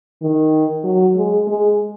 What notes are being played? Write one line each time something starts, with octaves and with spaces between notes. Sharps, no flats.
D#3
F#3
G#3
G#3